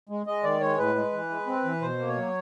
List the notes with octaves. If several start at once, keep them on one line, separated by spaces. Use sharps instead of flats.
G#3
G#3 D#5
D#3 D5
G#3 C#5
A2 B4
G#3
E3
G#3
C4
E3
B2 C5
A#3
C#5
F#3